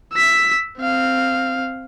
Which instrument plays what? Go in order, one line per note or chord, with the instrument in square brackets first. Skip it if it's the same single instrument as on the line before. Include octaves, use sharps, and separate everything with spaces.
[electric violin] E6 B6
C4 F5